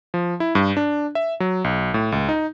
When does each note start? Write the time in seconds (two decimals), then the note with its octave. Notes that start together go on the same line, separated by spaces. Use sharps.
0.14 F3
0.40 E4
0.55 G2
0.77 D4
1.15 E5
1.40 F#3
1.64 B1
1.94 A2
2.12 C#2
2.29 D#4